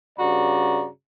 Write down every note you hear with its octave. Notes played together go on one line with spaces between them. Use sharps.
G2 C#3 F#4 D5 A#5